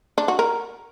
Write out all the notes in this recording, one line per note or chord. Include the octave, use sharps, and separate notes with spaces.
D4
F#4
A#4